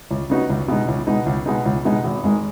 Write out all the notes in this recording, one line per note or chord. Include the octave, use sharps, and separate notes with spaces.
C#2
C#3 B3 D#4 F#4
C#2
B2 G#3 D#4
C#2
B2 G#3 D#4
C#2
B2 G#3 D#4
C#2
B2 G#3 D#4
G#1
G#2 D#3 G#3